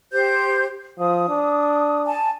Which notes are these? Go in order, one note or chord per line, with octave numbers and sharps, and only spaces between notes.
G4 C5 G6
F3 D#6
D4
G#5 A5